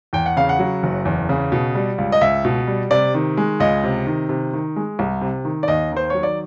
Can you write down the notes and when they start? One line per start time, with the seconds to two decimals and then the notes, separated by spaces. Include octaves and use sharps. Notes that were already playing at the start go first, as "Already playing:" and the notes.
0.13 E2 G5
0.26 F#5
0.37 C#3 F5
0.49 F#5
0.59 F#3
0.83 F#1
1.05 E2
1.29 C#3
1.52 B2
1.75 G3
1.98 C#2
2.12 D#5
2.21 C#2 E5
2.45 B2
2.67 G3
2.91 C3 D5
3.14 D#3
3.37 G#3
3.60 C#2 D#5
3.84 C3
4.07 D#3
4.29 C3
4.53 D#3
4.76 G#3
4.99 C2
5.21 C3
5.45 D#3
5.63 D5
5.68 D#2 D#5
5.92 D#3 C5
6.10 F#3 C#5
6.23 D5